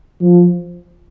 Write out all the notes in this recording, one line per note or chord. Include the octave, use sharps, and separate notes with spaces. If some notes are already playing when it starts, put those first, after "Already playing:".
F3